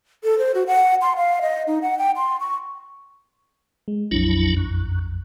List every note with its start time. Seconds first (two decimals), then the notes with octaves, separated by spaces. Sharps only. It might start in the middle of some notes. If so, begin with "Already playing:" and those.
0.24 A4
0.38 C5
0.54 F#4
0.67 F#5
1.01 C6
1.16 F5
1.42 D#5
1.67 D#4
1.82 F#5
1.99 G5
2.17 C6
2.40 C#6
3.88 G#3
4.11 A#1 F2 F#3 D4 E4
4.57 F#2